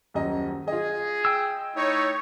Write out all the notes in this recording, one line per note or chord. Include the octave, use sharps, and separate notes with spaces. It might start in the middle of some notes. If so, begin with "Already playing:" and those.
D#1 F#2 D#5
F4 G#4 D#5
G5 E6
A3 D#4 E4 C#5